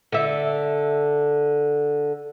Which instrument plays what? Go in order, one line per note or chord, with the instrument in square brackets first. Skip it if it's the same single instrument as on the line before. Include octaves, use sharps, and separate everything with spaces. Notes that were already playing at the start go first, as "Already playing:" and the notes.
[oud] D3 E5